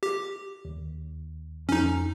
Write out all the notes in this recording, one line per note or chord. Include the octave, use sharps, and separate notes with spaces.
G4
D#2
F2 C#4 D#4